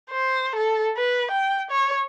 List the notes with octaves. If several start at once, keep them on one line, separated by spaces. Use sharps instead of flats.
C5
A4
B4
G5
C#5